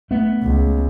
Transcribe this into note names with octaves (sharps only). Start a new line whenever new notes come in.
A3 B3
C#2